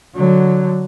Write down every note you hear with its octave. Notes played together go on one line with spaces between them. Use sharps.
D3 F#3